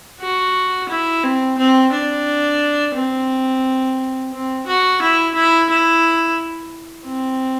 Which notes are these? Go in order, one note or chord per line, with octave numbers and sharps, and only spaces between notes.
F#4
E4
C4
C4
D4
C4
C4
F#4
E4
E4
E4
C4